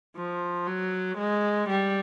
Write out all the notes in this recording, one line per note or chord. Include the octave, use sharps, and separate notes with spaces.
F3
F#3
G#3
G3